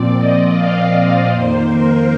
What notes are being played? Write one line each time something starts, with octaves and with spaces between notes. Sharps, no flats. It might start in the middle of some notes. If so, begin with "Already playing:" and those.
Already playing: A#2 F3 C4 D5
D#5
F5
D5
F2 D#3 A#3 C5
A#4